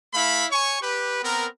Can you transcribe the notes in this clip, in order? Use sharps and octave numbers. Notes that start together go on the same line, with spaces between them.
A3 E4 F5 B5
C#5 G#5 C#6
G4 B4
B3 C4 A#4